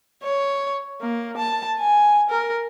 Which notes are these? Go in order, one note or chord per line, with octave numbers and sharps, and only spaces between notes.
C#5
A#3
A5
G#5
A#4